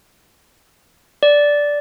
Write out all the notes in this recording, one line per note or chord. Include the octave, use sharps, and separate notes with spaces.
D5